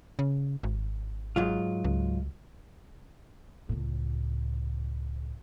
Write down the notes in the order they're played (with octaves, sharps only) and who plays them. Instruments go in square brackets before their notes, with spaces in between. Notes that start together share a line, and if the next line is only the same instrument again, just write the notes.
[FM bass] C#3
G#1
[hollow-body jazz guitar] G#2 F#3 F4
[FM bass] C#2
[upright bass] C#2 A2